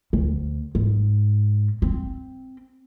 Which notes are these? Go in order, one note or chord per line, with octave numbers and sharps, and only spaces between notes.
D2
G#2
C4